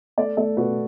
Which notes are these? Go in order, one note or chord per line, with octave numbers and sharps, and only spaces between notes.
A3 A4 D5
A3 A4 D5
B2 F#4 B4